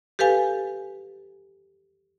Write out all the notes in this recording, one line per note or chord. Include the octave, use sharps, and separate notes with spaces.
G4 A4 B4 F5 G#5